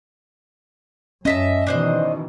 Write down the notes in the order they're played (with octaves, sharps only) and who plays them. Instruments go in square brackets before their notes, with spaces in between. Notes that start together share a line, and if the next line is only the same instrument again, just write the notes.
[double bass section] F#2 [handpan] C#4 [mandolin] D#5 E5 A5
[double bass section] B2 D#3 E3 [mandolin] D4 C5 D#5